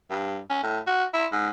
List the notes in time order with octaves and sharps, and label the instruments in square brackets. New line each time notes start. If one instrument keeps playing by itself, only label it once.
[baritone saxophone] G2
C#4
A2
F#4
E4
G#2